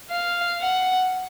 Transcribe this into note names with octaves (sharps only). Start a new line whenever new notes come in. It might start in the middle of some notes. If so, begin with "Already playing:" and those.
F5
F#5